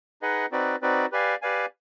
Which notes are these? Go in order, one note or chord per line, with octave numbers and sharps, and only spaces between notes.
D#4 G#4 B4 D#5 F#5
C4 D#4 F#4 B4 D5
C4 D#4 F#4 B4 D5
G4 B4 D5 F5 G#5
G4 B4 D5 F5 G#5